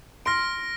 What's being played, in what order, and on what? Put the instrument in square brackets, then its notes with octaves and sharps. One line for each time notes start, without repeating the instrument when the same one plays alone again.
[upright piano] C6 [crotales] F6 A#6 D7